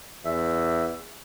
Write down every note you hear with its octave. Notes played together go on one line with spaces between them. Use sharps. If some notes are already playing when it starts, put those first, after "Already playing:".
E2 E5